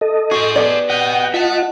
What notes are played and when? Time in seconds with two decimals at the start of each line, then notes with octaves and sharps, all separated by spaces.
0.01 A4 D#5
0.31 F#4 G#4 C5
0.56 B3 G4 D5
0.90 F#4 D#5 F#5 G5
1.34 F4 D#5 E5 F#5 A5